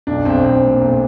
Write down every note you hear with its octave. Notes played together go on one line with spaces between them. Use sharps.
B1 D4
B1 C4
B1 C4
A#2
B1